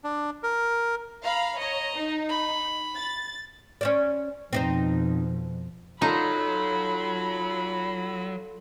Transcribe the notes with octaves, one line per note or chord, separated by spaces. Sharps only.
D4
A#4
F5 A#5 B5
C#5 D#5 A#5
D#4
B5
A6
C#4 C5 D5
F2 B2 C4 D#4 C5
F#3 D#4 F4 A4 B5